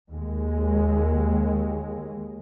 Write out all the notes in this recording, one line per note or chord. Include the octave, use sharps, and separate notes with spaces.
D#2 G#3